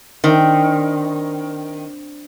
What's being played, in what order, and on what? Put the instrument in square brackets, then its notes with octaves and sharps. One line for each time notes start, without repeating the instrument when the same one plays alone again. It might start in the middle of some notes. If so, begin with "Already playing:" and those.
[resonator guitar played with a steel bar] D#3 [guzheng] C4 D4